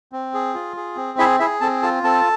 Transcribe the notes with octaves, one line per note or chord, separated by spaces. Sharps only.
C4
G#4
F4
G#4
C4
E4 G#4 E5
E4 G#4 E5
C4 A4 A5
F4 A4 A5
C4 A4 A5